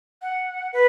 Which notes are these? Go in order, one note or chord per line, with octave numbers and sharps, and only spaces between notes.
F#5
B4